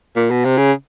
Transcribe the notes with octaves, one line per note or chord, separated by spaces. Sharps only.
A#2
B2
C3
C#3